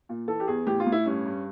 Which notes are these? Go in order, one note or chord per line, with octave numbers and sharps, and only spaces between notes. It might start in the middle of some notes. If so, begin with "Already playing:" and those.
A#2
E3 A4
G4
E2 G#4
A2 G4
F4
A2
E4
G2 C#4
G2